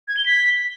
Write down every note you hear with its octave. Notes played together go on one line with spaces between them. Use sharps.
G#6
G7
B6